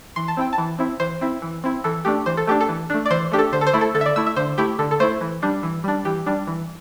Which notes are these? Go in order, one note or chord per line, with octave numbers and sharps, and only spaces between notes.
E3 C6
A5
C4 E4 G5
A5
E3
C4 E4
E3 C5
C4 E4
E3
C4 E4
E3 A4
A3 D4 G4
E3 C5
A4
A3 D4 G4
A4
E3
A3 D4
D5
E3 C5
A3 D4 G4
A4
D3 C5
A4
C5
A3 E4
A4
D3 A4
E5
D5
A3 E4 E6
E5
D3 C5
A3 E4 G4
D3 A4
A4
A3 E4 C5
E3
G3 D4
E3
G3 D4
E3 G4
G3 D4
E3